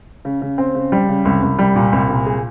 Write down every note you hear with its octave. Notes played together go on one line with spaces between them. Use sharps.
C#3
C#3
C4
C#3
G3
C#3
C2
C2
G3
A#2
C2
A#2
G#4